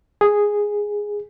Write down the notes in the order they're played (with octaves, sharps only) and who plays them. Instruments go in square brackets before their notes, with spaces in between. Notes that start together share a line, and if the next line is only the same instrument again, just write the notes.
[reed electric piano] G#4